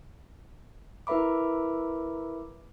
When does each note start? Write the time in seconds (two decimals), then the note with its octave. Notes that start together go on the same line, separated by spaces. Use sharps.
1.07 E4 A#4 B4 E5 B5 D6